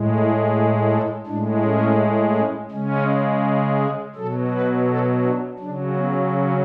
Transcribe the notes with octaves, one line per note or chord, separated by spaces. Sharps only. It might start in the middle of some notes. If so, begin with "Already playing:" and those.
Already playing: A2 G#3
E4
G#4
A4
A2 G#3 D4
C#4
C#4
C#3 G#3 C#4
G#4
B2 F#3 A4
B4
A4
D4
C#3 F#3 D4
B3
C#4